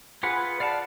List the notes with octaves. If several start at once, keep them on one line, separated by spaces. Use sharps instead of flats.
F4 G#4 B4 F#5
D5 F5 F#5 A5